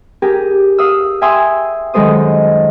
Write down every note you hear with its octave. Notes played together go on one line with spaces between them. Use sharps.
G4 G#4 A#4
F5 D#6 E6
E5 G5 G#5 C6 D#6 E6
F#2 D#3 G#3 A4 C5 D#6